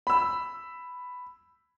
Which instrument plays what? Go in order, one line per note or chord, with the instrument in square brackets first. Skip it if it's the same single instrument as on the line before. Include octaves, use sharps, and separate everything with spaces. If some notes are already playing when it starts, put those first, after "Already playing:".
[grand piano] B5 E6